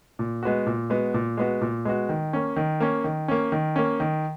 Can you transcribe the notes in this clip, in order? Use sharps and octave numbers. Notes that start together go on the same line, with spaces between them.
A#2
G#3 B3 F#4
A#2
G#3 B3 F#4
A#2
G#3 B3 F#4
A#2
G#3 B3 F#4
D#3
A#3 C#4
D#3
A#3 C#4
D#3
A#3 C#4
D#3
A#3 C#4
D#3